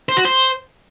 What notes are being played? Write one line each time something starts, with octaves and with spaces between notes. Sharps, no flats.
C5
F#4
C5